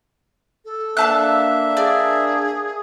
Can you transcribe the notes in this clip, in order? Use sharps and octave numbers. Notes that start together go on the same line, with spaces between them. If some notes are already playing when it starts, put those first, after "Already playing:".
A4
A#3 D4 E5 F5 A5 F#6
G#4 D5